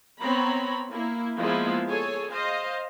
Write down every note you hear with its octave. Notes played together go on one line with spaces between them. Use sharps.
B3 C4 C#5 A#5 B5
A#3 E4
F3 G#3 A#3 B3 E4
G#4 A4 C#5 G#5
C5 D#5 F5